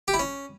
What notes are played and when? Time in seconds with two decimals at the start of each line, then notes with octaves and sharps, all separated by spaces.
0.08 G4
0.14 E4
0.19 C#4